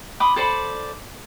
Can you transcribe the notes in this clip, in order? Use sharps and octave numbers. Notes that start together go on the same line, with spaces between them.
B5 C6 D6 D#6
A4 C5 D5 B5